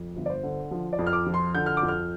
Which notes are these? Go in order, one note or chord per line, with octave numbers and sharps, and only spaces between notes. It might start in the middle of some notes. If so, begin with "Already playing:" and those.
Already playing: F2
G1
D5
C5
D3
F3
D5
F2
F6
D6
F3
C6
D3 G6
F6
D6
F2
F6